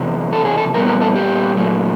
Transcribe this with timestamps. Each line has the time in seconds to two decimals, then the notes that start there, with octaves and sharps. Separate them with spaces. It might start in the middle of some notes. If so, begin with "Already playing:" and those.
Already playing: E2 C3
0.33 A4
0.45 G#4
0.58 A4
0.74 A#2 G3 B3 A#4
0.88 A#4
1.01 A4
1.15 G4
1.57 A#2 F#3 A3